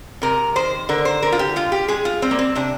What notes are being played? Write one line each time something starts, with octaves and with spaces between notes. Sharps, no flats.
C3 A#4
D#3 C5
D3 A#4
C5
D3 A#4
F4
G4
G#3 F4
G4
G#3 G#4
F4
G3 C4
A#3
C4
C3 D4